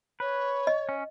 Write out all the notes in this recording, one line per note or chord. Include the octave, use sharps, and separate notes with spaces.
B4 C#5
D#5
C#4